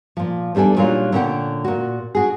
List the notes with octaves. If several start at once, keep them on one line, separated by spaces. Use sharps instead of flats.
A#2 F3
E2 G3 D4 A4 G#5
A#2 F#3 G3 D4 D#4 F4
A#2 D3 C#4 F#4 F#5 G5
A#2 F#4
D4 F#4 G#4